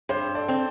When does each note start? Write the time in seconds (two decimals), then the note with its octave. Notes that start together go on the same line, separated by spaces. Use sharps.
0.09 G2 C5
0.35 A4 D5
0.48 C4